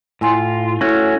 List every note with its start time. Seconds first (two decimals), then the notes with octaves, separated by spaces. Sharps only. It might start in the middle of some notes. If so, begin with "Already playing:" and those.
0.21 A2 E4 F4 G#5 C6
0.81 A3 C#4 E4 F#4